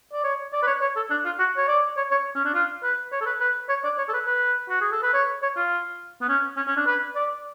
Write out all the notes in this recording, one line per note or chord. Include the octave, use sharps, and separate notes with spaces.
D5
C#5
D5
B4
C#5
C#5
A4
D4
F4
F#4
C#5
D5
C#5
C#5
C#4
D4
F4
B4
C#5
A4
B4
B4
C#5
D5
C#5
A4
B4
B4
F#4
G#4
A4
B4
C#5
C#5
F4
B3
C#4
C#4
C#4
D4
B4
D5